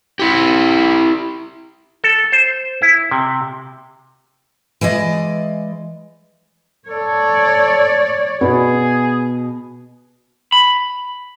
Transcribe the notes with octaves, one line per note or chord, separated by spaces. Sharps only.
E4 G4
A4
C5
E4
C3
E3 G#3 D5 D#5
A4 C#5 D5
B2 B3 G#4
B5